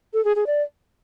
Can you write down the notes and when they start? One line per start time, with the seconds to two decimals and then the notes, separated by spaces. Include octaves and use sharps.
0.14 A4
0.25 G#4
0.36 G#4
0.47 D5